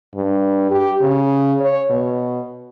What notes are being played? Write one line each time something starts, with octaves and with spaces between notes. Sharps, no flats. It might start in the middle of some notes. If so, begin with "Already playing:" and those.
G2
G4
C#3
C#5
B2